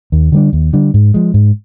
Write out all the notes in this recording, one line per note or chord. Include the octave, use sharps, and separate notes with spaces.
D#2
D3 G3 D4
D#2
D3 G3 D4
G#2
F3 G#3
G#2